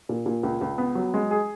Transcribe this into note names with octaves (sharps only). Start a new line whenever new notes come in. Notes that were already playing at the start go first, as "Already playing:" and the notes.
A#2
A#2
C#2
C#2
B3
F#3
G#3
G#4